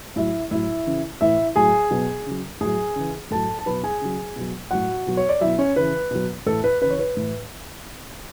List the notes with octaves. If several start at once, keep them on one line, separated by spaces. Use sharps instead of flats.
A2 F#3 E4 E5
A2 F#3 E4 E5
C#3 E3
A2 E3 E4 E5
A2 F#3 G#4 G#5
B2 F#3
C#3 F#3
A2 F#3 G#4 G#5
C#3 E3
A2 F#3 A4 A5
A5
B2 F#3 B4 B5
G#4 G#5
C#3 F#3
B2 F#3
A2 F#3 F#4 F#5
B2 F#3
C#5
D5
B2 F#3 E4 E5
C#4 C#5
C#3 E3 B4
B2 F#3
A2 E3 A4
B4
C#3 E3 B4 C#5
B4
A2 E3